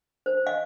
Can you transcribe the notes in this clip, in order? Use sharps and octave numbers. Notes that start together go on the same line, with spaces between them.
C5
D#5 F5